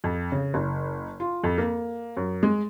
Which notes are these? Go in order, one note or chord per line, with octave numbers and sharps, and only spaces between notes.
F2
C#3
F#1
F4
F2
A#3
F#2
G#3